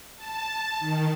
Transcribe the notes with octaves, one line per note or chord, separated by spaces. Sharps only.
A5
D#3